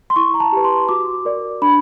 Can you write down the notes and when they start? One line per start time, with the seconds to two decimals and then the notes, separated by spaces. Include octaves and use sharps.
0.10 C6
0.16 E4 C#6
0.34 A#5
0.40 A5
0.52 G4 B4
0.64 C6
0.89 F#4 D6
1.25 A#4 D5
1.62 D4 B5